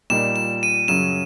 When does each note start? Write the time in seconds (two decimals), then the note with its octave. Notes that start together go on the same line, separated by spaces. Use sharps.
0.10 A#2 G3 A#3 D#4 E7
0.36 E7
0.63 D#7
0.88 F#2 C#3 F#3 E7